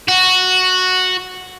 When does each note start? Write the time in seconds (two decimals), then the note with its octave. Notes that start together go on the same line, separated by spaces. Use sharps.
0.08 F#4